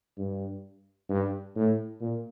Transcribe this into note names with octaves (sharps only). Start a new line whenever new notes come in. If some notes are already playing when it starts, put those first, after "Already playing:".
G2
G2
A2
A#2